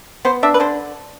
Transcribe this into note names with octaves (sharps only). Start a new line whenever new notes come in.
B3 C5
D4 E5
B4
D3 C5